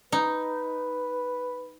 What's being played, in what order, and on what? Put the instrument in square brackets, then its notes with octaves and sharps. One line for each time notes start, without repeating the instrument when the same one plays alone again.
[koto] D#4 [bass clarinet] B4